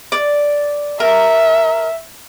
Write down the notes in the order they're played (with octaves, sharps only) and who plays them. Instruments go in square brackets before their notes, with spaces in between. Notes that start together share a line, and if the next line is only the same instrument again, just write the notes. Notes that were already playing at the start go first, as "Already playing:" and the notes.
[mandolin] D5
[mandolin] A#4 [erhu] E5